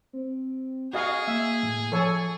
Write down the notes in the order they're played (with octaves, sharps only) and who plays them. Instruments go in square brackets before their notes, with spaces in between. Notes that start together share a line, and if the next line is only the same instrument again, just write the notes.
[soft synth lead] C4
[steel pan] F#4 D#5 F5 [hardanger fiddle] G#4
[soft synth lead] A#3 [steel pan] E5
[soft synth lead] A2
[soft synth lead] F3 [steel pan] A4 C#5 G#5